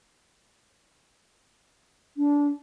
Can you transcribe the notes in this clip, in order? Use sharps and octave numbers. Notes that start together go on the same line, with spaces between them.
D4